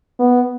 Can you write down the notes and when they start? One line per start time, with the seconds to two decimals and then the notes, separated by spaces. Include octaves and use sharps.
0.19 B3